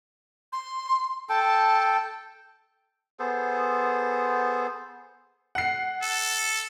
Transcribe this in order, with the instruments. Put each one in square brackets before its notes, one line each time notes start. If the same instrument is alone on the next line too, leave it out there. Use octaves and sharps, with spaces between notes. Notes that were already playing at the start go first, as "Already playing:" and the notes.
[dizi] C6
[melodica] A4 G5 [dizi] A5
[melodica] B3 G#4 A4 C5
[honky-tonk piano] F#5 C7
[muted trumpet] A4